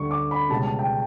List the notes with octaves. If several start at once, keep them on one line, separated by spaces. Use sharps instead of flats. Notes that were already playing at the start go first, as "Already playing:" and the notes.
Already playing: D2 D3 G3 C#6
D6
B5
C#2 B2 G3 A5
A5
G5